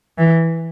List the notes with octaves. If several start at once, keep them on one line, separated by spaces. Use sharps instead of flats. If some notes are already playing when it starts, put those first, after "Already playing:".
E3